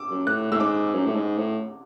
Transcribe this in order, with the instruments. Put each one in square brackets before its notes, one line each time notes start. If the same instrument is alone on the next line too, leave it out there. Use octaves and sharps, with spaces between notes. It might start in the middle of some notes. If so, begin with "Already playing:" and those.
Already playing: [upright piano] D6 E6
[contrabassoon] F#2
[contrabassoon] A2 [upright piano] F#6
[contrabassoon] A2 [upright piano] E6
[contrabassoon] G#2 [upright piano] D6
[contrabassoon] F#2
A2
G#2
A2